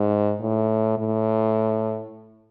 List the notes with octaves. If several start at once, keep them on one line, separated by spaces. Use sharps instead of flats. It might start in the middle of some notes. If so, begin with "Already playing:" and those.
Already playing: G#2
A2
A2